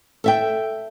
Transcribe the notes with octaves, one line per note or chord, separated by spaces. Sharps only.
A4 E5 G5